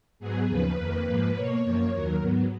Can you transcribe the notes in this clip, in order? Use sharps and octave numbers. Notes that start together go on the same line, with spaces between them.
G#2 F#3 B3 G#4
D#2 C#3 F3 B4
F2 D#3 A#3
G#2 F3 A#3
B2 A#3 C#5
F#2 F3 A#3
D#2 D#3 F#3 A#4
G#2 F#3 B3